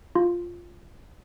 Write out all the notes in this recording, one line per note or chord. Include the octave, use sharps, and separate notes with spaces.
F4